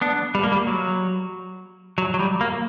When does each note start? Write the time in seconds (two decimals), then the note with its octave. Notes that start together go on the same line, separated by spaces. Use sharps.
0.01 B3 D4
0.35 G3
0.43 A#3
0.52 G3
0.67 F#3
1.98 F#3
2.14 F#3
2.19 G3
2.41 A#3